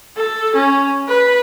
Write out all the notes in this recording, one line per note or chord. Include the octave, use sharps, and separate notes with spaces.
A4
C#4
B4